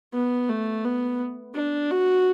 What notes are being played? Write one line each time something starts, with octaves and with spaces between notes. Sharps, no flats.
B3
A3
B3
D4
F#4